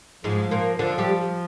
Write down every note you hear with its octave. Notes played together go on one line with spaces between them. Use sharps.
G#2 F3 G#3
A#2 A#3
D3 F3 D4
G3 G4